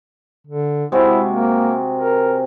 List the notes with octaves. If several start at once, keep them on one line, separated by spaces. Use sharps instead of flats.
D3
C3 G#3 E4 F#4
A#3
A#4